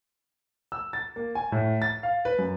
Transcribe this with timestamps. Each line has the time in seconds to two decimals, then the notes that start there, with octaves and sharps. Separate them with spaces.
0.72 E6
0.93 A6
1.16 A#3
1.35 G#5
1.52 A2
1.82 A6
2.03 F5
2.25 B4
2.38 F#2